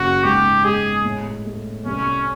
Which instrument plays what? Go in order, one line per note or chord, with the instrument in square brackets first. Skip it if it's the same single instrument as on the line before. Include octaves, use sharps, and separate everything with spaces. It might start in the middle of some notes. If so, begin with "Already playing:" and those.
Already playing: [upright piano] F#1 C#3 [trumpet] F#4
[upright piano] G#2 [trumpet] G4
[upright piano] G#3 [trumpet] G#4
[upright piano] A2
A3
[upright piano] C2 [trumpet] C#4